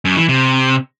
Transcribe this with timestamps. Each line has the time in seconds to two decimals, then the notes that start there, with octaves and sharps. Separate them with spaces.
0.05 F#2
0.17 E3
0.29 C3